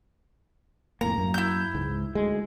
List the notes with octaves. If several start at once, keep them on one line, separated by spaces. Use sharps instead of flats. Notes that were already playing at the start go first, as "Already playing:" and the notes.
F2 A2 A#3 A#5
F#2 A#3
E4 G6
C#2 G#2
D2 G#3